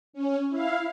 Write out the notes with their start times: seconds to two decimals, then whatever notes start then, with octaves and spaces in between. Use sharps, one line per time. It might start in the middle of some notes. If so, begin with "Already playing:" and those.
0.13 C#4
0.50 E4 F5